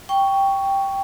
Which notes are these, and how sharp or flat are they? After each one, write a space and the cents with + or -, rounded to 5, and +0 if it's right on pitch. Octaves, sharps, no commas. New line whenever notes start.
G5 +0 C#6 +10